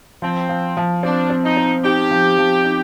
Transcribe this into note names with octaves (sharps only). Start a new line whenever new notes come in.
F3 C4
F3
F3
C4 D4
C4
D#4
C4
D#4 G4
F3
F3
D#4